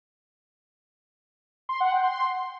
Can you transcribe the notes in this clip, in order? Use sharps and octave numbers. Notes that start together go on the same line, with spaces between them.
C6
F#5
G5
C6